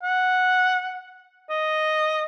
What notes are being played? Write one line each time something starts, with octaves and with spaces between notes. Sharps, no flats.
F#5
D#5